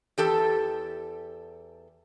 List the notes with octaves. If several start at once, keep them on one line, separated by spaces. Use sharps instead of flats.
E2 G4 A4